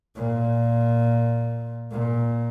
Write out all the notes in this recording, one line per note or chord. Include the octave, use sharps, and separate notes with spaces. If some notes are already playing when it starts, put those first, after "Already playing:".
A#2
A#2